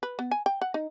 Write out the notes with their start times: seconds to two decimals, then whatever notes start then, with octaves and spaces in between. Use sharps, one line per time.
0.03 B4
0.19 B3
0.31 G#5
0.46 G5
0.61 F#5
0.74 D#4